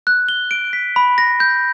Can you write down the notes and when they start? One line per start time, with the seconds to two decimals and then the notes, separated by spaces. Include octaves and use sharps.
0.07 F#6
0.29 G7
0.51 D7
0.73 B6
0.96 B5
1.18 A#6
1.40 G6